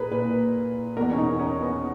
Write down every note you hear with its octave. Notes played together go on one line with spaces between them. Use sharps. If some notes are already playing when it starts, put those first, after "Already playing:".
Already playing: A#2 G#4 A#4 B4
A#2 B4
E2 B2 A#4
C#4
D#4
C#4
B3